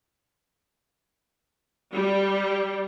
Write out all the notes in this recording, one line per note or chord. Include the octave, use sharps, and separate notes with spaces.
G3